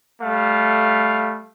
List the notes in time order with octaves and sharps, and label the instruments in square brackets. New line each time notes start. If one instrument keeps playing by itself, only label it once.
[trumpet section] G3 A3 F5